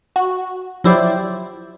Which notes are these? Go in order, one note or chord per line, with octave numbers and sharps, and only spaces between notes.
F#4
F3 F#3 E4 G4 C5 D5